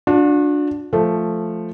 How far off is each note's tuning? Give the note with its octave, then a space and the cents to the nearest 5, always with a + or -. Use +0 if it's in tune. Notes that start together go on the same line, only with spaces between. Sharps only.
D4 +0 F#4 -45
F3 +0 A3 +0